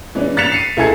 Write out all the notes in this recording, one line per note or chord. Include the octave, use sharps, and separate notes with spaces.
E3 G#3 C#4 D4
F#6 A6 B6 C#7 E7 F7
C7 C#7 D#7
C#2 E4 A4 G#5 G#6 C#7